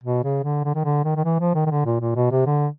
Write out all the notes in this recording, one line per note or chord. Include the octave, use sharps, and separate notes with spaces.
B2
C#3
D3
D3
D#3
D3
D#3
D#3
E3
F3
D#3
D#3
D3
A#2
A#2
B2
C3
D3